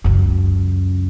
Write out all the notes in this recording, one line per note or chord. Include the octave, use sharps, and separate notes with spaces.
C#2 F#2